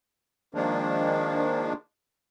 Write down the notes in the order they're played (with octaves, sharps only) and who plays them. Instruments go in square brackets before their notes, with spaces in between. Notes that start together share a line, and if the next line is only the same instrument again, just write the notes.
[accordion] D#3 F3 G#3 A#3 D4